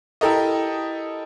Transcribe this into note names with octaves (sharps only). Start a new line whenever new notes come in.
E4 G4 A4 A#4 D#5